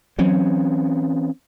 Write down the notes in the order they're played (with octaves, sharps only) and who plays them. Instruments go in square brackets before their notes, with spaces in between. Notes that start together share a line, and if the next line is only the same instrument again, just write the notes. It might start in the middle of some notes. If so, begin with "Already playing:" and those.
[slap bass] E3 C4 C#4 [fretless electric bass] F#3